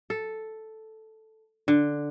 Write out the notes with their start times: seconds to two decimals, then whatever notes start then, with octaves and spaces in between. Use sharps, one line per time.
0.10 A4
1.68 D3